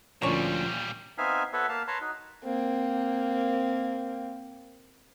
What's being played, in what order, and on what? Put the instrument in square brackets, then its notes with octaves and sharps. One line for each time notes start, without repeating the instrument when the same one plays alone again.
[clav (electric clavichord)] D2 C#4 D4 [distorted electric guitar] A#2 G3 [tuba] F3 [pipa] A#3 C#5
[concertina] B3 C4 D#4 E5 F5 G#5
B3 F#4 A4 B4 C#5 E5
A#3 F5 A5
B4 C#5 A5 A#5 C6
D#4 F#4
[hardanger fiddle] A#3 C4